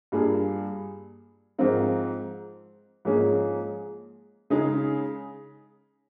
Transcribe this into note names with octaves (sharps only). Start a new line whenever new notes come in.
G2 G3 A#3 F4 G#4
G#2 F3 C4 F4 A#4
G#2 F3 A#3 C#4 G#4
C#3 G#3 D#4 G#4